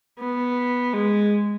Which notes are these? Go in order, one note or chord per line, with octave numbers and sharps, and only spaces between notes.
B3
G#3